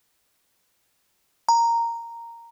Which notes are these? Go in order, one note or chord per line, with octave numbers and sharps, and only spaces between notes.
A#5